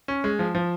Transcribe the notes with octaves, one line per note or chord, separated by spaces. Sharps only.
C#4
G#3
F3
F3